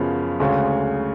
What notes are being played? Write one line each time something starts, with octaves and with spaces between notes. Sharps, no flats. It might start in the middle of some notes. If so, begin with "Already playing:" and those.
Already playing: F#2 C#3 F3 B3
D2 C#3 G#3